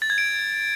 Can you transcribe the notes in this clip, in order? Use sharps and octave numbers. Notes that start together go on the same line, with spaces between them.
A6
G#6
D7